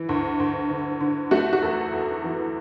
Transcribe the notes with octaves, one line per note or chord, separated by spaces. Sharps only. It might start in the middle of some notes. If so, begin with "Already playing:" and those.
Already playing: E3
D2
D2
D3
D3
A3 F#4
F#4
E2 A4
E2
E3